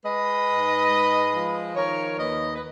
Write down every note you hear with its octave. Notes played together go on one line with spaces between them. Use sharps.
G#3 B4 D#5
G#2
G#3
F3
D#3 A#4 C#5
D#2 B4 D#5
B4